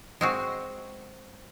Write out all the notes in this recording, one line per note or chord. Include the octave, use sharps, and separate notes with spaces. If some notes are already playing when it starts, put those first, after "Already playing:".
G#3 C4 F#4